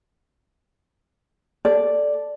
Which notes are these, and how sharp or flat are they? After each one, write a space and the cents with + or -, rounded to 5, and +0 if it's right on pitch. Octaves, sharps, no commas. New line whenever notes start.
A4 +0 D5 +0